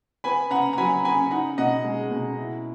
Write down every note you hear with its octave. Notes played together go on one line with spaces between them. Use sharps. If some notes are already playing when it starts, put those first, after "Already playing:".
B3 G#5 B5
C#3 F#5 A#5
A#5
F#3 G#5 B5
C#3 G#5 B5
D#4 F#5 A#5
B2 D#5 F#5
G#3
B2
E4